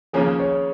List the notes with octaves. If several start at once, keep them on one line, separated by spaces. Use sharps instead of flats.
D#2 C#3 F3 A#3 C#4 G#4
C#5